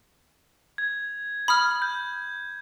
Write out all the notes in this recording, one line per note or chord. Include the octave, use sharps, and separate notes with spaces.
G#6
B5 D#6 F6
G6